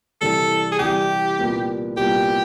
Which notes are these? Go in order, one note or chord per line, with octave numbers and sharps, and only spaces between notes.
C2 C3 E3 G3 A4
G#4
C2 C3 E3 G3 G4
C2 A#2 G3 B3
C2 A#2 G3 B3 G4